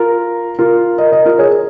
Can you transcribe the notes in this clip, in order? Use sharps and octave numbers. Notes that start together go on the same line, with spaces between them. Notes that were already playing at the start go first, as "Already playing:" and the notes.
Already playing: F4 A#4
F4 A#4
A#4 D#5
A#4 D#5
F4 A#4
G#4 C#5